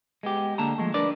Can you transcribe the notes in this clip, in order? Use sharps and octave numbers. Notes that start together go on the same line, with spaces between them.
G#3 B3 G4
D3 A#3 A5 A#5
F3 G#3 A3
D4 A#4 B4 D5